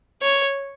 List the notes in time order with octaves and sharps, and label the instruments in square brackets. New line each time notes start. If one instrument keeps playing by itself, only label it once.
[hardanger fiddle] C#5